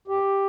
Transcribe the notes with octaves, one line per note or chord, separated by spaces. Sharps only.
E2 G4